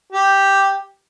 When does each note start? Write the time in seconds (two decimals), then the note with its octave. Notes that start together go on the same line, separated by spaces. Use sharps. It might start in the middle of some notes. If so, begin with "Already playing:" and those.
0.12 G4